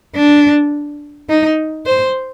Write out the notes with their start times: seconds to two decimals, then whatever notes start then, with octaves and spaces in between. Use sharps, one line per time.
0.16 D4
1.29 D#4
1.86 C5